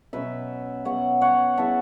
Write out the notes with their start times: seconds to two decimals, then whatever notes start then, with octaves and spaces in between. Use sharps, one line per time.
0.13 B2 F#3 C#4 B4 E5
0.85 B2 B3 C#5 F#5
1.21 C#5 F#5
1.57 C#3 E3 B3 E5 A5